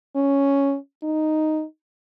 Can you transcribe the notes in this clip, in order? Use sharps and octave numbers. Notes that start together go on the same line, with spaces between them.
C#4
D#4